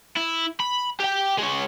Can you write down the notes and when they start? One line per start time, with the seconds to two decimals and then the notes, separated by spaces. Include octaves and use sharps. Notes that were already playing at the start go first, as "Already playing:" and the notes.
0.17 E4
0.60 B5
1.00 G4 G5
1.38 G#3 C#5